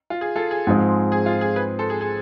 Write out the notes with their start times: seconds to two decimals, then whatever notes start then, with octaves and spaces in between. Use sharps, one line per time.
0.10 F4
0.21 G#4
0.36 F4 A4
0.51 G#4
0.67 G#2 F3 G#3 C4
1.12 G#4
1.26 F4
1.41 G#4
1.56 G#4 B4
1.79 A4 C5
1.90 G#4
2.01 G#4